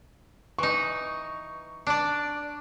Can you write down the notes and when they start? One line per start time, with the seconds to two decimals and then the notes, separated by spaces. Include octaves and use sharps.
0.59 E3 D#4 C#6
1.87 D4 D5